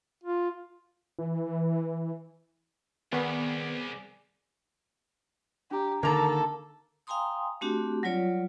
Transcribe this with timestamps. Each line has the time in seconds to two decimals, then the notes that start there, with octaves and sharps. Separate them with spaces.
0.23 F4
1.19 E3
3.12 C2 D#3 B3 G#4 D5
5.71 D4 G4 A#5
6.03 D3 D#3 A#3 A4 A#4 A#5 A6
7.07 F5 G5 G#5 A#5 C6 D#6
7.61 A3 C4 D4 F#4 G4
8.03 F#3 G3 F4 C#5 D5